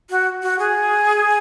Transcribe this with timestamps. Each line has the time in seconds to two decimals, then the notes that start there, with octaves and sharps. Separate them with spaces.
0.10 F#4
0.43 F#4
0.59 G#4